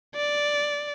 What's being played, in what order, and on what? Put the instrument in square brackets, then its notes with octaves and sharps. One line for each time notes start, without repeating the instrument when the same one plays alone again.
[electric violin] D5